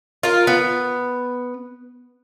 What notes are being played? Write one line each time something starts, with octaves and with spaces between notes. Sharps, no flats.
F4 A#4
B3